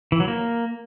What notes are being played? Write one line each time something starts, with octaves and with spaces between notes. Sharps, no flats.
E3
F#3
A#3